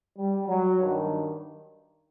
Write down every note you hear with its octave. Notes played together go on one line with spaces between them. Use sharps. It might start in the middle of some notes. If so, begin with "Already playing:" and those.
G3
F#3
G2 D#3